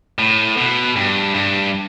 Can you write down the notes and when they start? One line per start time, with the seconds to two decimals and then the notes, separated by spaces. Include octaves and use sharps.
0.19 A2
0.57 B2
0.96 G2
1.34 G2